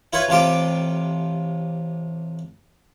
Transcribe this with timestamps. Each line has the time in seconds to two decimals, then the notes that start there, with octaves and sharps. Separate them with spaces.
0.13 E4 F4 B4 C#5
0.29 A1 C3 F4 G4 A5 D6